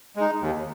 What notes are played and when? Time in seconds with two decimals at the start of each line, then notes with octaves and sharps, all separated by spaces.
0.16 G#3 D#4
0.41 D#2